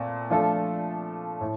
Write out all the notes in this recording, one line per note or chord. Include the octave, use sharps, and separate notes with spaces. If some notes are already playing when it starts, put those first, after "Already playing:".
Already playing: A#2 A3 C4
F3 A3 D4 F4 A4
A2